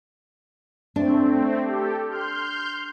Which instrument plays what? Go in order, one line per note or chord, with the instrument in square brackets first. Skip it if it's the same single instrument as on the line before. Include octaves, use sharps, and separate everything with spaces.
[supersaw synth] A3 C4 [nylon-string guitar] D4
[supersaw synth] G4 A4
C6 F6 G6